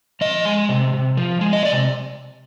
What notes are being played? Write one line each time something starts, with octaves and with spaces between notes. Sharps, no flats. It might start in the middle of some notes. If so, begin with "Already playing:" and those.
F3 D#5
G#3
C3
C3
F3
G#3
D#5
C3 D5